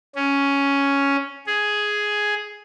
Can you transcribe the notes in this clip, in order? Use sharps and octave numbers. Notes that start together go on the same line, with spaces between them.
C#4
G#4